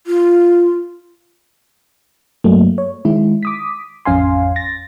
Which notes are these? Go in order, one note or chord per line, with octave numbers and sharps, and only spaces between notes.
F4
G2 F#3 A3 A#3
C#5
D#3 G#3 E4
D6 D#6 B6
A1 F2 C#4 F5 G#5 C6
A6 A#6